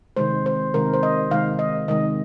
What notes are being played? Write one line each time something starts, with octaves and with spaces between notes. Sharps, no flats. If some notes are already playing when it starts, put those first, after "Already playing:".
C3 D#3 G#3 C5
C5
C3 D#3 G#3 A#4
C5
D#5
C3 D#3 G#3 F5
D#5
C3 D#3 G#3 D#5